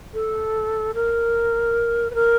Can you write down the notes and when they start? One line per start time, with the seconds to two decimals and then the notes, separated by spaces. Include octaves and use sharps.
0.14 A4
0.94 A#4
2.10 B4
2.14 A#4